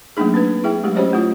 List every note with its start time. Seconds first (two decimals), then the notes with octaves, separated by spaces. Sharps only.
0.17 F#3 A3 A#3 D4 D#4 G#4
0.34 C4 D4 B4
0.64 E4 G#4 E5 G5
0.83 F#3 G#3 A3 G4
0.96 C#4 F#4 G4 C5 C#5 D#5
1.13 A3 E4 F4